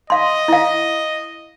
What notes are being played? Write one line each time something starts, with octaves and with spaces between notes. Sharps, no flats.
D#5 F5 C6
E4 F5